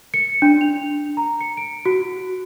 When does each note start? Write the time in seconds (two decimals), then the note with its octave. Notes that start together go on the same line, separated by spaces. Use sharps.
0.14 C#7
0.42 D4
0.61 F7
1.17 A#5
1.41 C#7
1.57 D7
1.86 F#4